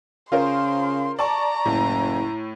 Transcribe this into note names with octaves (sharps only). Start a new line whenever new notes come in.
C#3 F4 A#4 C5 C6
D5 A5 A#5 C#6
F#1 A2